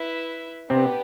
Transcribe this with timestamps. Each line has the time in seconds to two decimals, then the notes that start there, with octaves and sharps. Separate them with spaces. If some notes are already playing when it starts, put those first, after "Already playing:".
Already playing: E4 B4 E5
0.70 C3 B3 C4 D4 G4 D5